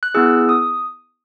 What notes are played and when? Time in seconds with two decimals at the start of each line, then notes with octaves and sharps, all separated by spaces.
0.03 F#6
0.15 B3 E4 G#4 E6
0.49 D#6